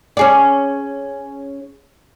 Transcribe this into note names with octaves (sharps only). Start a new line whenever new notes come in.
C#4 G#4 D5